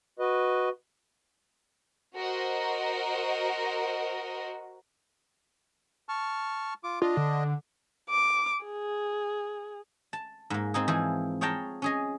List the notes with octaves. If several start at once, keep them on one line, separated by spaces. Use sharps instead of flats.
F#4 B4 D#5
F#4 A#4 C5 D#5
A5 C#6 F6
F4 D6
D4 F4 D#5
D3
D6
G#4
A5
G#2 A#3
C4 D#4 G#4
E3 F3 G#4 C5
G#4 C#5 F5 G5 A5 A#5
C#4 G#4 D#5